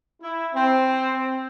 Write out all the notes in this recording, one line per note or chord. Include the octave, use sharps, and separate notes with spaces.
E4
C4